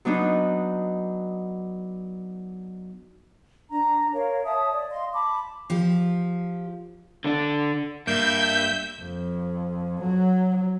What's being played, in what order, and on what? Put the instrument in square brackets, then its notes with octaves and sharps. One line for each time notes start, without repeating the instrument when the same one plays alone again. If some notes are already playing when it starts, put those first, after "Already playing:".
[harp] F#3 B3 D4 D#4
[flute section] D4 A#5
A#4 C#5 F5
C#5 E5 A5 D#6
D5
D#5 F5 C6
A5 B5 D6
[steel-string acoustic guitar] F3 G4
[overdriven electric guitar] D3 D4
[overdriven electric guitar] G2 [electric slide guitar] A#3 [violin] E5 [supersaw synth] G6
[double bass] F2
F#3